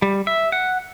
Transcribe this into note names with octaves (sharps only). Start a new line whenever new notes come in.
G3
E5
F#5